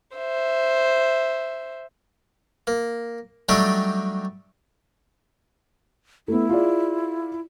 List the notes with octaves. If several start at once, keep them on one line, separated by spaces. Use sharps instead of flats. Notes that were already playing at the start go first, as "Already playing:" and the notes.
C5 E5
A#3
F#3 G3 A3 D4 D#4 G4
A3 B3 E4
F4 G#4 D5